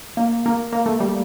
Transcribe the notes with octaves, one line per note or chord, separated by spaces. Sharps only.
A#3
A#3
A#3
A3
G3